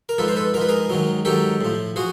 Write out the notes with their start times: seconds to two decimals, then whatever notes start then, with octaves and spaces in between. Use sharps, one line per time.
0.09 A#4
0.18 G#2 F3 A4 B4
0.28 C5
0.36 A4 B4
0.54 G#2 A#4
0.57 F3 B4
0.69 G#4 A#4
0.89 G#2 D#3 F#3
1.25 G#2 D#3 F#3 G4 A4
1.61 A2 F3
1.96 F3 F#4 G#4